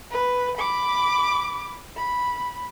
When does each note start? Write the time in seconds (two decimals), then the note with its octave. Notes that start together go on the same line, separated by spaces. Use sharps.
0.11 B4
0.57 B5 D6
1.96 B5